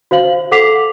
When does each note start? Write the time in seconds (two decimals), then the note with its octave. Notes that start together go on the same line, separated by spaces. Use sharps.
0.11 F#4 C5 F5 F#7
0.51 A4 F#5 D6 B6 C7 F7